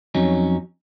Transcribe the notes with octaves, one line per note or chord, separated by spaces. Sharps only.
F2 F#3 C#4 D#4